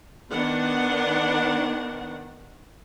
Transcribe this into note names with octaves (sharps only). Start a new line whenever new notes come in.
D#3 B3 D4 F#5